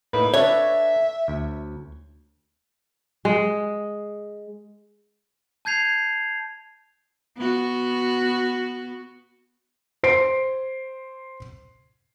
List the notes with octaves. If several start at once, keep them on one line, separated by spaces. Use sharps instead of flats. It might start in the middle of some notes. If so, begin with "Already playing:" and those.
A2 A#3 D#4 B4
D4 A4 B4 C#5 E5
D2
G#3
A5 G6 G#6 C7 F7
B3 F#4
C5 C7 D7